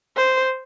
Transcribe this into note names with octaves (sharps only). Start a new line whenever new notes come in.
C5